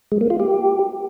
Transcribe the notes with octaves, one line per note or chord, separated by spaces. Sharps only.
G#3
A#3
F4
G4